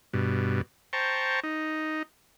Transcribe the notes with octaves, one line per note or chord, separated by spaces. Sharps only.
G2 B2
C5 G5 A5 A#5 C#6
D#4